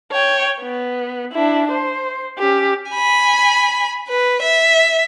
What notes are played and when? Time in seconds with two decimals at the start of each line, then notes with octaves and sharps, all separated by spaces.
0.12 C#5 G5
0.60 B3
1.32 D4 E4
1.72 C5
2.39 C#4 G4
2.91 G#5 B5
4.09 B4
4.43 E5